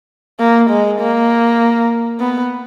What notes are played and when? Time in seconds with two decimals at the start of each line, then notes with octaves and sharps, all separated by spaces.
0.40 A#3
0.70 G#3
1.00 A#3
2.20 B3